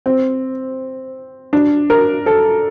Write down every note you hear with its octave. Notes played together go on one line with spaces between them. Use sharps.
C4
D4
A#4
A4